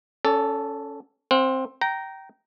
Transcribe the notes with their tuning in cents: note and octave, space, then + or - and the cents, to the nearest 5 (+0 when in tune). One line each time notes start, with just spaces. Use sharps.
C#4 +5 A4 +0 D5 -35
C4 +5 F#5 -45
G5 -20 A#5 +0